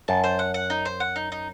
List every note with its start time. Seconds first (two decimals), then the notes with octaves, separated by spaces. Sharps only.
0.08 F#2 A5
0.24 C5
0.39 F#5
0.54 F#5
0.70 D#4
0.85 C5
1.00 F#5
1.16 D#4
1.32 D#4